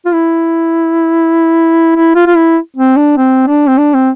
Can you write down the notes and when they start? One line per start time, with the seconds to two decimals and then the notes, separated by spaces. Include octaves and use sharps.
0.06 F4
0.13 E4
1.96 E4
2.15 F4
2.27 F4
2.36 E4
2.77 C4
2.97 D4
3.17 C4
3.47 D4
3.68 C4
3.78 D4
3.94 C4